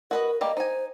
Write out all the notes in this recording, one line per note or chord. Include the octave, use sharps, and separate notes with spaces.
F#4 A#4 B4 D#5
G3 A#3 G4 D#5
D#4 C5 G#5